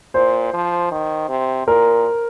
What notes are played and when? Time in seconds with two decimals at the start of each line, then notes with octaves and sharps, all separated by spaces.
0.14 A#2 C5
0.54 F3
0.91 D#3
1.29 C3
1.67 A#2 A#4